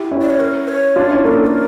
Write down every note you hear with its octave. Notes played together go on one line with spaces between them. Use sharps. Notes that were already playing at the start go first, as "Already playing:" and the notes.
Already playing: E4 G4
C#4 E4
D5
C#5
A#4
C#5
D4 F4
C#4 E4
A#3 D4 A#4
A4
C#5
A#4